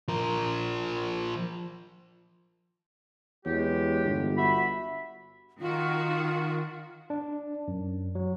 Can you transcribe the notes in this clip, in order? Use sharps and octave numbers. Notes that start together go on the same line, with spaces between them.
F3 A#4
E2 F#3 G#3 G4
G1
F#4 E5 B5
D#3 F4 F#4
D4
F#2
F#3